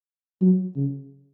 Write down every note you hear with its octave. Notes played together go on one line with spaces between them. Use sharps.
F#3
C#3